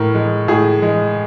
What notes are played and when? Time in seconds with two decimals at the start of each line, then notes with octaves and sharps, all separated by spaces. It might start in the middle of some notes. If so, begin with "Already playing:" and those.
Already playing: A2 A#4
0.15 G#3
0.48 A2 G#4
0.82 G#3